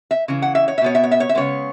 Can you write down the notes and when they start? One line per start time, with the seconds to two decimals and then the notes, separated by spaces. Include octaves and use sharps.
0.11 E5
0.28 C#3 E3
0.42 F#5
0.55 E5
0.68 C#5
0.78 E5
0.81 B2 B3 C#5
0.95 E5
1.03 C#5
1.11 E5
1.20 C#5
1.29 E5
1.35 C#3 G#3 B3 C#5